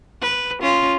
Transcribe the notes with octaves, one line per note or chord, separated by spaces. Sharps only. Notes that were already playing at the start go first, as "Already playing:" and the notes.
B4
C#4 F4